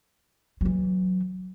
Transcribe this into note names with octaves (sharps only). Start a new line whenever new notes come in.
E3 F#3